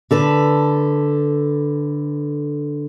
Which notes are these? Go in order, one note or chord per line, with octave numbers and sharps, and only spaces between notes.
D3 A4 B4